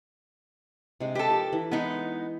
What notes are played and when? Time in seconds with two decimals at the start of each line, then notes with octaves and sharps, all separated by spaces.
1.00 C3 G#3 D4
1.15 G4 A4 B4
1.30 F3 A#4
1.53 E3
1.71 G#3 B3 D#4 E4 A4